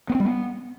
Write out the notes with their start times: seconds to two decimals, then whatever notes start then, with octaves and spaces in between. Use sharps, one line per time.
0.10 B3
0.15 C4
0.20 G3
0.25 B3